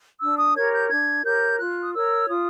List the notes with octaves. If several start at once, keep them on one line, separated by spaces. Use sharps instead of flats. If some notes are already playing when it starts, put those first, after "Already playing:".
D4 E6
D#6
G4 A#4 C#5 G#6
G6
D4 G#6
G4 A#4 C#5 G6
F4 F#6
D#6
A#4 C#5 E6
F4 D#6